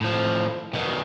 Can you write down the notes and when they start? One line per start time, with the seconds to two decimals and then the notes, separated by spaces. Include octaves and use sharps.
0.01 A2 F3
0.73 B2 D#3